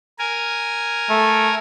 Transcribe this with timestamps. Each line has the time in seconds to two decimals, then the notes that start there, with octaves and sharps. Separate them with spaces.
0.19 A#4 G#5
1.10 A3